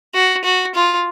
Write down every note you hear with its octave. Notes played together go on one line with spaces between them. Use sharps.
F#4
F#4
F4